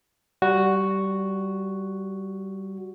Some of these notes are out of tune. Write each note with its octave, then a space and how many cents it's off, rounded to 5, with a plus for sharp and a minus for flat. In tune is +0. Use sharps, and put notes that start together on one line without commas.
G3 -20 F#4 +0